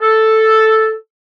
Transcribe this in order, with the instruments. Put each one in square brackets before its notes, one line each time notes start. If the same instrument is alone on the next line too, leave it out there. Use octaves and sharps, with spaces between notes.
[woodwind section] A4